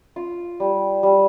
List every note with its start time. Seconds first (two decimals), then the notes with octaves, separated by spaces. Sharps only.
0.16 F4
0.60 G3
1.03 G3